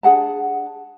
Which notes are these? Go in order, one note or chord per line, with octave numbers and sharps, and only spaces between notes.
D4 G#4 F#5 A5